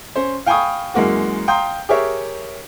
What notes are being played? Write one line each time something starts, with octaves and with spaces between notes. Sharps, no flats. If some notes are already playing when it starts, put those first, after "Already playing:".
C#4 C5
F5 G5 G#5 B5 C#6 D#6
F#2 E3 G#3 A#3 F#4
F5 G5 A#5 C6 D#6 G6
G4 G#4 A#4 C#5 E5